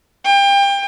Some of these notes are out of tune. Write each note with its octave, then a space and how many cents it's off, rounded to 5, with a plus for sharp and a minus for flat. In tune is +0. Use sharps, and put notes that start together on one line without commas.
G5 +30